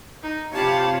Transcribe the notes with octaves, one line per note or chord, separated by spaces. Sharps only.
D#4
C3 F4 G4 C#5 A5 B5